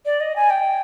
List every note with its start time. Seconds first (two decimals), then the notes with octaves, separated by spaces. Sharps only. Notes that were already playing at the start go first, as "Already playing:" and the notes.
0.06 D5
0.21 D#5
0.36 G#5
0.50 G5